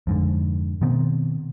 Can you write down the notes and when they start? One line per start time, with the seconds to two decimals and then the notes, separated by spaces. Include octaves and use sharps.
0.07 F2 G#2 D3
0.81 B2 D#3 B3 C4